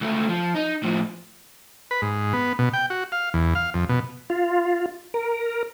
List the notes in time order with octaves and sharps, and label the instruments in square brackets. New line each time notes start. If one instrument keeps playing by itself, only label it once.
[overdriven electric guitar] C#2 A3
F3
D#4
A2 F3
[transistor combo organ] B4
G#2
B3
B2
G5
F#4
F5
E2
F5
F2
B2
[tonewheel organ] F4
A#4